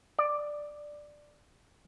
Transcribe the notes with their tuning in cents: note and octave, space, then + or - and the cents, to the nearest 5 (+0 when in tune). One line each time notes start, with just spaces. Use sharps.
D5 +10